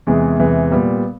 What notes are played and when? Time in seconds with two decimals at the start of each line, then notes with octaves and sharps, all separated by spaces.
0.07 E2 C3 E3 G#3
0.39 E2 C3 E3 G#3
0.71 A#2 G3 B3